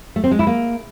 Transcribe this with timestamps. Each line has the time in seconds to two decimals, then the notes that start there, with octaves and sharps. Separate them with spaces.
0.16 A3
0.24 C4
0.31 G#3
0.39 E4
0.47 A#3